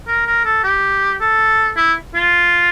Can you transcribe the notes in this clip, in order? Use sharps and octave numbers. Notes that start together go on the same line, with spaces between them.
A#4
A#4
A4
G4
A4
E4
F4